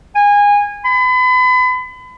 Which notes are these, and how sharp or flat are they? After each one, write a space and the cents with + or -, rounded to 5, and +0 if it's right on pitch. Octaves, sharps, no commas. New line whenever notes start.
G#5 -25
B5 +35